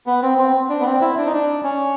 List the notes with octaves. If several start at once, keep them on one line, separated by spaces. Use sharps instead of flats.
B3
C4
C4
D4
B3
C4
E4
D4
D#4
D4
C#4